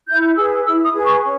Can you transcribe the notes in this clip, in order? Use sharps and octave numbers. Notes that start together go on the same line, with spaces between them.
E4 G6
G#4 B4 E6
E4 E6
D#6
G#4 B4
C#6
C#4